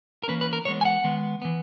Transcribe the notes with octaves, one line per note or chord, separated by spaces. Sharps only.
A#4
E3 A#3 C#4 B4
B4
A#4
E3 G#3 B3 C#5
G#5
F#5
D#3 G#3 B3
E3 B3